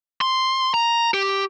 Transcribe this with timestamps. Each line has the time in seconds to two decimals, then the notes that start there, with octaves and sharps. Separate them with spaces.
0.21 C6
0.74 A#5
1.14 G4